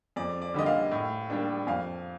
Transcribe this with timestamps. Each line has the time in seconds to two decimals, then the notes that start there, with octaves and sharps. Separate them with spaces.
0.16 F2 D5
0.42 D5
0.54 D3 G3 A#3 D#5
0.66 F5
0.92 A2
1.30 G3 A#3 D4
1.67 F2 F5